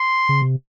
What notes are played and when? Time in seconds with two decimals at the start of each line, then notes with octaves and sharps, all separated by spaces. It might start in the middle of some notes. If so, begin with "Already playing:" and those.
Already playing: C6
0.29 C#3
0.42 C3